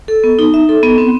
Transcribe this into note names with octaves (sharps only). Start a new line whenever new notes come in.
A4
B3
D#4
E5
A4
B3
C4